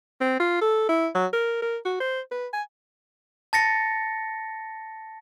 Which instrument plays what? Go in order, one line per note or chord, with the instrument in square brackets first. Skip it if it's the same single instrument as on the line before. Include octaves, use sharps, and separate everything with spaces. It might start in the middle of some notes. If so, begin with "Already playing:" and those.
[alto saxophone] C4
F4
A4
E4
F#3
A#4
A#4
F#4
C5
B4
G#5
[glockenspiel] A5 A6 A#6 C#7